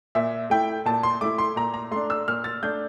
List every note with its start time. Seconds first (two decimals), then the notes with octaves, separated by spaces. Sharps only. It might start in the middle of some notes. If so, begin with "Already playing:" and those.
0.15 A#2 E5
0.50 A3 E4 G5
0.86 A#2 A5
1.03 C6
1.21 A3 E4 D6
1.38 C6
1.56 A#2 A#5
1.74 A#5
1.91 A3 D4 C6
2.10 E6
2.28 A#2 F6
2.44 A6
2.63 A3 D4 G6